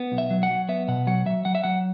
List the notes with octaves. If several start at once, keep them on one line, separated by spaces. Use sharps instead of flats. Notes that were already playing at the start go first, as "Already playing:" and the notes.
Already playing: B3
B1
E5
F#3
F#5
F#3
B3 E5
B2 F#5
F#3 F#5
F#3 E5
F#3 F#5
E5
F#3 F#5